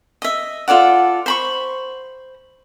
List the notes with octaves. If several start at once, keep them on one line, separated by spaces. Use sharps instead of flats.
D#5 E5
F4 A4 D5 F#5
C5 B5 C#6